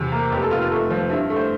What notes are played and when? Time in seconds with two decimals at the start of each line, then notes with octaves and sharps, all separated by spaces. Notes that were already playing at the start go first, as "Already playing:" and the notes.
Already playing: E2 C3
0.12 A#3
0.31 F1 G4
0.42 A4
0.51 F1 F4
0.61 F4
0.72 A3
0.90 F3
1.10 G2 E4
1.30 A3
1.36 C5